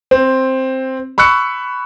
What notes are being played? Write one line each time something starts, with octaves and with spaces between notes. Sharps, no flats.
C4
B5 C#6 E6 F#6 C#7